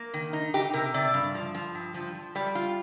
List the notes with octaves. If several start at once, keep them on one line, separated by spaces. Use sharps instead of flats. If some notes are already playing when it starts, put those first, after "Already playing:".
Already playing: A#3
D#3
D#4
D#4 G4
C3 A#4
C3 D5
G2
F3
F3
G2
F3
F3
G3 D5
F4